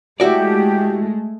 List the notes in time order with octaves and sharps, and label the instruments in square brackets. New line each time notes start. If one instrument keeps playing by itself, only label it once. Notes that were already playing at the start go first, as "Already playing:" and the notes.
[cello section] G#3 A3 [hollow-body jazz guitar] E4 F#4 D5 [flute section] G4